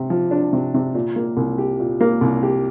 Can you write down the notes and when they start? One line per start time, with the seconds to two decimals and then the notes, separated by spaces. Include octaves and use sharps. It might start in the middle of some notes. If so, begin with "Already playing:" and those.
Already playing: C3
0.10 F3
0.31 D4
0.53 C3
0.74 C3
0.95 A#2
1.16 A#3
1.37 C2
1.58 G4
1.80 A#2
2.01 A#3
2.21 C2
2.43 G4